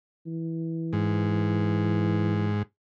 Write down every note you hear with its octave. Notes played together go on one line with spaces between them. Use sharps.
E3
G#2